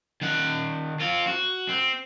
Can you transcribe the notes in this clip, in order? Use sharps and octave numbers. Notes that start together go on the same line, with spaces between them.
D#3 F#5
C4 F4
F#4
C4